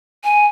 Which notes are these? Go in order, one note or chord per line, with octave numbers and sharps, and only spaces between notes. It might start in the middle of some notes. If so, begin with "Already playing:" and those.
G#5